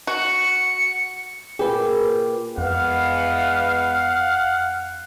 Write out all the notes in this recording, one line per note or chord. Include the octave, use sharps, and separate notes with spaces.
F#4 C#7
A#2 G4 G#4 B4
F2 E3 G#3 B3 F5 F#5